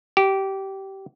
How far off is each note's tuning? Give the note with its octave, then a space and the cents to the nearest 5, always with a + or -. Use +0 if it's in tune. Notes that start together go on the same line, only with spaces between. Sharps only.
G4 -20